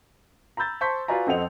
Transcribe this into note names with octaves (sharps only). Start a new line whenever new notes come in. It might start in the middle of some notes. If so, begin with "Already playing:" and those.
A#5 B5 E6 G6 A6
C5 A5 C6 C#6 G6 B6
F4 F#4 B4 D5 G#5 A#5
F2 C4 A4 D#5 F#5 F7